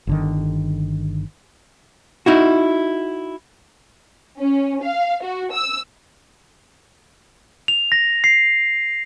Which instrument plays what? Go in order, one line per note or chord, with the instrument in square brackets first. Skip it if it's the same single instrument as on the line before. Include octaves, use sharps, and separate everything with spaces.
[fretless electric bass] G1 D3 D#3
[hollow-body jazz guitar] D#4 E4 F#4
[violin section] C#4
F5
F#4
E6
[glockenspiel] F7
A#6
C7